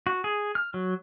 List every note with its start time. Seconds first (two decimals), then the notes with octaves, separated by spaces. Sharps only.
0.07 F#4
0.24 G#4
0.55 F6
0.74 F#3